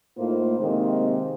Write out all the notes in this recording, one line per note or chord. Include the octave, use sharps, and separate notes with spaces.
A2 A#3 D#4 F4 C5
C3 D#3 G#3 A#3 C4